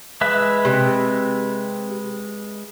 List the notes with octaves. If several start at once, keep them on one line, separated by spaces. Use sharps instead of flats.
G#3 B4 E5
C3